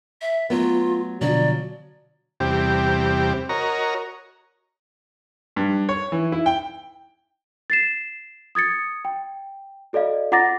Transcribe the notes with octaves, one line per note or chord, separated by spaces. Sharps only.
E5
F#3 A3 B3 F4
B2 D3 F3 F#3 D5
E2 C3 G3 C4 G4
F#4 A#4 C#5 D#5 A#5
G2
C#5
E3
E4
G5
A6 C7 E7
D#6 G#6 A6 C#7
G5
F#4 A4 D5 D#5 F5
F4 F#5 A#5 D6 A6 A#6